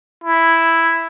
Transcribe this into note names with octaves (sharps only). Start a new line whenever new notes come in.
E4